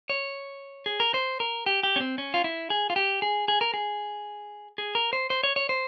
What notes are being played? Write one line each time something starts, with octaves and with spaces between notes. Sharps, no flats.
C#5
G#4
A#4
C5
A#4
G4
G4
C#4
C4
C#4
F4
E4
G#4
F4
G4
G#4
G#4
A#4
G#4
G#4
A#4
C5
C5
C#5
C#5
C5